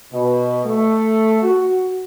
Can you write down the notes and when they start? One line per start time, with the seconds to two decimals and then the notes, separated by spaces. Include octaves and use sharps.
0.11 B2
0.63 A3
1.42 F#4